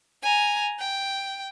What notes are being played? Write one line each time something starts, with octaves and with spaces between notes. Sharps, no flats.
G#5 A#5
G5